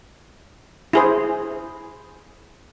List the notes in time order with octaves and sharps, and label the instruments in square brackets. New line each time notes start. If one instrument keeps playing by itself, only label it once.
[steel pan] E4 G#4 C5